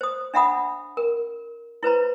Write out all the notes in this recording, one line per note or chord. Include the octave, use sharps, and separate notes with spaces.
C5 D#6
D4 E5 F#5 B5 D#6
A#4
E4 B4 C5 A#5